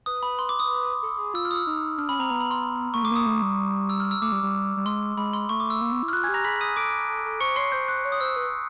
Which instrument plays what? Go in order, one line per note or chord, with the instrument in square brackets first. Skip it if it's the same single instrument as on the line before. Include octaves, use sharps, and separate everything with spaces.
[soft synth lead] B4 [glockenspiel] D#6
[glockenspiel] B5
C6
D6
D#6
[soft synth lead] A4
G#4
[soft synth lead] F4 [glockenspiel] E6
[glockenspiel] F6
D#6
E6
[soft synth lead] D#4
[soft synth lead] D4 [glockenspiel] F6
[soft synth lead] C#4 [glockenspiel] B5
[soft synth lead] C4 [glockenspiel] A#5
[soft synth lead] B3 [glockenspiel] A#5
[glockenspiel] B5
C6
[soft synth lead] A#3 [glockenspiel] C#6
[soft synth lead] A3 [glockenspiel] D6
[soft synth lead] A#3 [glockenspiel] D#6
[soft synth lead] A3
G3
[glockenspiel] E6
F6
E6
[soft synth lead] A3 [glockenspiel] D6
[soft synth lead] G3
G3
G3
[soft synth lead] G#3 [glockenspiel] C6
[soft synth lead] G#3 [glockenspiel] B5
[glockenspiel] C6
[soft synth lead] A3 [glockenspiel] C#6
[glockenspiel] D6
E6
[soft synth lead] A#3
B3
E4
[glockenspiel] F6
[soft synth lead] F4 [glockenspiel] F#6
[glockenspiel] G#5 G#6
[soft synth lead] G4
[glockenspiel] A#5 A#6
[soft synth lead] G#4 [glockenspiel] B5 B6
[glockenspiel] D#6 D#7
[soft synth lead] A4 [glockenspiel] D6 D7
[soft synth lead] A4
A4
[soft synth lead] C5 [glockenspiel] C#6 C#7
[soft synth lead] C#5 [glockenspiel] C6 C7
[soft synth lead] C5 [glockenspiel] G6
[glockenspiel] F#6
[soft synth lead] C#5
[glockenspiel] D#6
[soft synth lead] C5 [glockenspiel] E6
[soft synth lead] B4